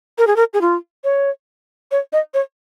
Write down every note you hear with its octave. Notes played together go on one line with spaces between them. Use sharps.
A#4
G#4
A#4
G#4
F4
C#5
C#5
D#5
C#5